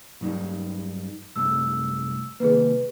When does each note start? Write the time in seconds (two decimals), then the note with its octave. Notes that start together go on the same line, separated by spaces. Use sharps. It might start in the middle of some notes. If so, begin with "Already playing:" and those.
0.21 G2 F#3 D#4
1.36 C2 F#2 A3 E6
2.40 C2 D#3 A#3 G#4 B4